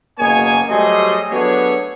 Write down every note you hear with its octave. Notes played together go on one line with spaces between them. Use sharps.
F#1 B2 A#3 G#4 C#5 G#5
F#3 G3 A3 G#4 C5 D#5
F#3 A3 B3 D4 G#4 C#5